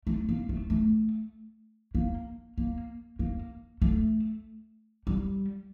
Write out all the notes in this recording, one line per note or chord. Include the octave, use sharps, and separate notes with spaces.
A3
A#3
A3
A3
A#3
A#3
A#3
A3
G3